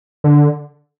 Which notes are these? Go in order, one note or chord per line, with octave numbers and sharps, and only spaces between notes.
D3